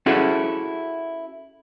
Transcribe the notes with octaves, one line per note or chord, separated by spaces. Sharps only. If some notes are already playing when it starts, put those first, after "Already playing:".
C#4 E4 F#4 G#4 A4